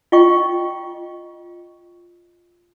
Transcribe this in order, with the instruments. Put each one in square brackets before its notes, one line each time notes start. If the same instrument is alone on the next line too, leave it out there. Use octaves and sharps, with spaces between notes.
[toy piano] F4 D#5 G5 C#6